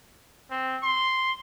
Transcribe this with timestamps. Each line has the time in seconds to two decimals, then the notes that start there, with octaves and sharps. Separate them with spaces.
0.50 C4
0.83 C6